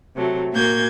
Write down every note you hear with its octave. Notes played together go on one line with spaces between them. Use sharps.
C3 F#3 A3
A#2 A#3 F#4 G6 G#6